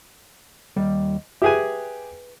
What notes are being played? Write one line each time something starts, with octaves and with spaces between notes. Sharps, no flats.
D#2 G3
G4 G#4 B4 E5 G#5